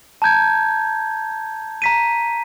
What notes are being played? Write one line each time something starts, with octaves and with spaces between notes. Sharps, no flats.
A5 A#5 G6 G#6
A#5 B6 D#7